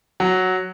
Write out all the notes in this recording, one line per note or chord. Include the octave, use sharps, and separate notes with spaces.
F#3